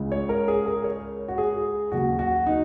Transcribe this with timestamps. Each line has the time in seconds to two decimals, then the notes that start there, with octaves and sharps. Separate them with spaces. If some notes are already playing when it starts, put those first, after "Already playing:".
Already playing: C#2 C#3 G#3
0.12 C#5
0.29 A#4
0.48 G#4
0.66 A#4
0.84 C#5
1.28 F#4
1.38 G#4
1.92 D#2 C#3 F#3 F#4
2.19 F#4
2.47 D#4